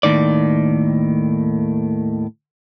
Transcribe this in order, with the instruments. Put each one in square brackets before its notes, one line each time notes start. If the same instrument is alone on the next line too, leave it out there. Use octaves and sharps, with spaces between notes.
[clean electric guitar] D#2 A2 D#3 D5